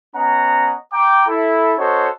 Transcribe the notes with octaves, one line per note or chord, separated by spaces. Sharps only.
B3 C#4 D#5 F#5 A#5
G5 A#5 D6
E4 A4
C#4 F#4 A4 C5 C#5 D#5